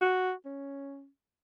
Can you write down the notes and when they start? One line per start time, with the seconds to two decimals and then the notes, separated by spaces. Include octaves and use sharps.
0.01 F#4
0.45 C#4